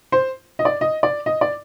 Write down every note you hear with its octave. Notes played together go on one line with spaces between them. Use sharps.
C5
D#5
D5
D#5
D5
D#5
D5